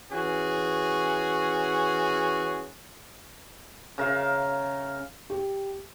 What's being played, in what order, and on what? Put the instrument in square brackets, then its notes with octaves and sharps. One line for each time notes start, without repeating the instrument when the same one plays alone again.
[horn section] E3 C#4 F#4 G#4
[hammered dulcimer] C#3 A#4 E5 F5
[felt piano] G4